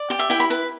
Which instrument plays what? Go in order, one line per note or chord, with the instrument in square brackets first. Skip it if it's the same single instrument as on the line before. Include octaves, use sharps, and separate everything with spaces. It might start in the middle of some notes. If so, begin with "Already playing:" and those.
Already playing: [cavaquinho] D5
G4 G5
E5
E4 G5
B5
B4 B5